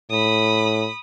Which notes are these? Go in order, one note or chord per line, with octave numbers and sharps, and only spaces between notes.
A2 B5 D#6